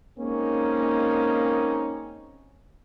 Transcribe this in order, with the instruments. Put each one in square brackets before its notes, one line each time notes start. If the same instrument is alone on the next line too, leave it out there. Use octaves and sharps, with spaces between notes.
[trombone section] G#3 A#3 C4 C#4 D#4